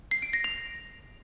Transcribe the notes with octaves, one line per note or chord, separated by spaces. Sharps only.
C7
D7
A#6
F7